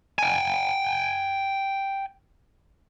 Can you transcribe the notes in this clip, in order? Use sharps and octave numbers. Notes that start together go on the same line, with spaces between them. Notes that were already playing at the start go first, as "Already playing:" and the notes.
G5 G#5